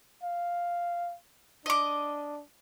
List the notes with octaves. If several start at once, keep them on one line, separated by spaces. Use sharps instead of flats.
F5
D4 D#5 D6